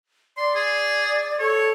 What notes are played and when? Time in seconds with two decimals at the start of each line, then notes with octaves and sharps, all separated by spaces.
0.37 D5 C6
0.55 G#4
1.40 A4 C#5